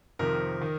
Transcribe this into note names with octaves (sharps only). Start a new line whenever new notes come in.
F2 C3 D#3 A#4
D#3